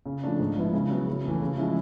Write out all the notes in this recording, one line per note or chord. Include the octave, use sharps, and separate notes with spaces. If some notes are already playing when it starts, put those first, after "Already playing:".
C#3
F3 A3 D4
G#2
F3 G#3 B3 E4
C#3
F#3 B3
C#3
E3 A3
C#3
F3 G#3 C#4 E4